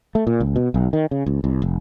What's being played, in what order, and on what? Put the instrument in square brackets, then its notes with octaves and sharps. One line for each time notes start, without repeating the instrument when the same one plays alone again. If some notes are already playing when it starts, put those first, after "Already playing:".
[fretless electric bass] A3
A#2
C#2
B2
B1
D#3
C#3
C#2
C2
F1